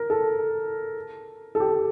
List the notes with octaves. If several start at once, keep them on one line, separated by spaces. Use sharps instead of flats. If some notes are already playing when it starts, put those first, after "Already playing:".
Already playing: A#4
A4
A4
G4